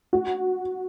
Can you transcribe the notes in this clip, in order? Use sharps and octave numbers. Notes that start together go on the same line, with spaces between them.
F#4